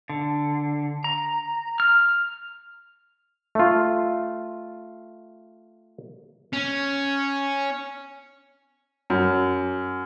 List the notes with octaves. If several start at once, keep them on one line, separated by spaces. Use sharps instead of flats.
D3
A#5
F6
A3 F4
C#4
F#2